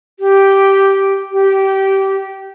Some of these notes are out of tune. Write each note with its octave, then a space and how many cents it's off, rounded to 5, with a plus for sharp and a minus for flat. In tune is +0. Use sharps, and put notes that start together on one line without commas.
G4 -5
G4 -20